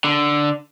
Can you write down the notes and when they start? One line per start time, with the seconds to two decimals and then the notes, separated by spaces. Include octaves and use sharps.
0.04 D3